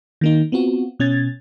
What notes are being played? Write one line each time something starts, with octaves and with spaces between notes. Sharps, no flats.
D#3 A#3 D#4
B3 C4 F4 F#4
B2 C#4 G#6 A6